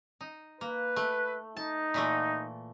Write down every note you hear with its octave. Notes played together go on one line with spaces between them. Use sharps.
D#4
A#3 B4
A3
D#4 A5
A#2 E3 A3